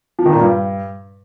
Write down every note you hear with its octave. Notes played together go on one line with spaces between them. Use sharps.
F3
D#3
A#2
G2